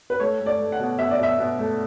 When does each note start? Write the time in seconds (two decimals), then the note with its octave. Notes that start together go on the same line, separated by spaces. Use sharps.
0.10 B4
0.20 A3 C#5
0.40 A3
0.46 D5
0.59 A3
0.72 F#5
0.80 B2
0.99 B2 E5
1.11 D5
1.19 B2 E5
1.39 B2
1.59 A3